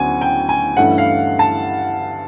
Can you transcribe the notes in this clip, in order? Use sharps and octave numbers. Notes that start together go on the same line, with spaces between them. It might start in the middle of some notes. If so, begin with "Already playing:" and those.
Already playing: D2 C#3 F#3 B3 D4 F#5 G#5
G5
G#5
G2 E3 A3 C#4 F#5
F5
A5